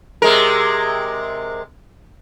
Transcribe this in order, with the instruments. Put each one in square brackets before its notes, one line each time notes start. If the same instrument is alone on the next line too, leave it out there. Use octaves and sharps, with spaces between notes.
[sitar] C3 G#3 A#4